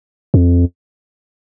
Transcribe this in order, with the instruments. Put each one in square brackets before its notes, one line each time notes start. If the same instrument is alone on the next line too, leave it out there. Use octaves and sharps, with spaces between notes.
[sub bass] F2